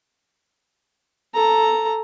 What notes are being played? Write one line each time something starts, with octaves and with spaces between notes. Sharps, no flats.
A4 A#5